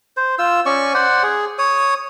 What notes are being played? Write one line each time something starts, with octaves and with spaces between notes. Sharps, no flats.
C5
F4 E6
C#4 D5 C#6
C5 D5 F#5
G#4
C#5 D#6